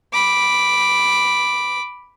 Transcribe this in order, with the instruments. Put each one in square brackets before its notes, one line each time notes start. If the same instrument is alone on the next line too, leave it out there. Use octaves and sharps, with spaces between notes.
[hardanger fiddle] B5 D6